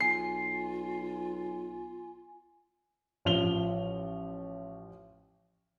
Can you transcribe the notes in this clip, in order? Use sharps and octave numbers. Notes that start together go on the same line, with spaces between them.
B1 F4 G#5 C7
A1 F3 F7 G7